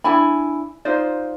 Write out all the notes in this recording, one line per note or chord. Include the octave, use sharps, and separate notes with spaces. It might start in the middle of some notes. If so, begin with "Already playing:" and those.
D4 E4 G#5 B5
D#4 F4 C5 D5